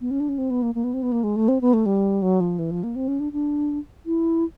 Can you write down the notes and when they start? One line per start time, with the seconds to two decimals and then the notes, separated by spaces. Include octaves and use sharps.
0.01 B3
0.11 C#4
0.20 D4
0.29 C#4
0.38 C4
0.50 B3
0.62 A#3
0.75 A#3
0.84 B3
0.94 C4
1.02 B3
1.12 A#3
1.24 G#3
1.36 A3
1.48 C4
1.61 B3
1.73 A3
1.86 G3
2.22 F#3
2.40 F3
2.59 E3
2.71 F3
2.83 A#3
2.96 C4
3.08 C#4
3.20 D4
3.33 D4
4.06 E4